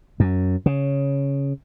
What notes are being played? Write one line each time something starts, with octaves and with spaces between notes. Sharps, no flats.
F#2
C#3